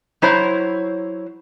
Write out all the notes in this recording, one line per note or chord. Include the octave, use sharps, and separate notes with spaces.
F#3 E4 C5 C#5